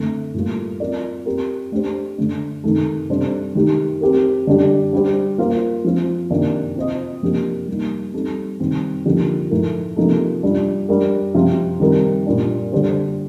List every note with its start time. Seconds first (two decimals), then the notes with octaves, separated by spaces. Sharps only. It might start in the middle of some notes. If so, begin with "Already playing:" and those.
Already playing: D3 A3 C4
0.34 A2 G3 A#3 F4
0.80 C4 F4 A#4 D5
1.25 C4 G4 A#4
1.72 A3 D4 G4 C5
2.18 D3 A3 D4
2.64 C3 D#3 A3 D#4 A4
3.10 C3 G3 D4 A4 C5
3.55 D#3 A3 D#4 G4
4.01 C4 G4 A#4
4.47 D3 G3 D4 G4
4.93 G3 D4 G4 C5
5.38 A#3 F4 C5 F5
5.84 F3 C4 F4 C5
6.30 C3 D#3 A#3 D4
6.76 C4 F4 C5 D#5
7.22 C3 F3 A#3 D4 G4
7.68 G3 A#3 D#4
8.14 G3 C4 D#4 A4
8.59 C3 D#3 G3 C4
9.05 D3 F3 A#3 D#4 G4
9.51 A2 F3 A3 D#4 A#4
9.96 C3 F3 A#3 D#4 A4
10.43 G3 D4 F4
10.89 G3 D4 G4 A#4
11.34 C3 F3 C4 F4
11.80 D#3 G3 C4 D#4 A#4
12.26 A#2 G3 D4
12.72 D3 G3 D4 G4 C5